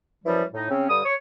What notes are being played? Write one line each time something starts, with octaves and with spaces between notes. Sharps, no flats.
F#2 E3 F3 G3
A2 D#4
C#3 C4 C#4
G2 D3 G3 D#6
C#5